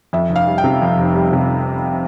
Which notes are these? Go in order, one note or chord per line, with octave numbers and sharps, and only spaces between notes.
F2 E5
F1
F5
G3
G5
C3
F2
F1
G3
C3